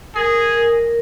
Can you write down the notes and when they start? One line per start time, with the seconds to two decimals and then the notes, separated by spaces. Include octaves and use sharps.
0.15 G#4 A#4
0.53 A#4